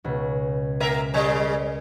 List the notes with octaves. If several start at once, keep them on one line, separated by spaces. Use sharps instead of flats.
C#2 B2
A#3 A#4 E5
C#3 G3 G#3 A#4